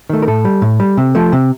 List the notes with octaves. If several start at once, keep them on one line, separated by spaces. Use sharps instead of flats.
D#3 A3
A#4
A2 A4
G3
A2
G3
C3
F3 A3
C3